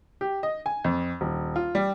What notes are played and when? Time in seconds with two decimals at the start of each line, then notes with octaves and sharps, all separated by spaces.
0.21 G4
0.43 D#5
0.66 G#5
0.84 F2
1.21 D#1
1.56 F4
1.75 G3